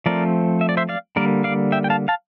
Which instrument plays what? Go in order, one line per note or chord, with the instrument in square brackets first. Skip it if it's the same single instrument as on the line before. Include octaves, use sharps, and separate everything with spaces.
[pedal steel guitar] F3 A3 C4 A#4 D5
E5
D5
C5 E5
D5 F5
D3 G3 A#3 A#4 D5
D5 F5
E5 G5
G5
F5 A5
F5 A5